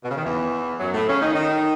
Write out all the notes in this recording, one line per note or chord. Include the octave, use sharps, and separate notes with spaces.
B2
C#3
D#3
E2 E3
F#2 F#3
A2 A3
C#3 C#4
D#3 D#4
D#3 D#4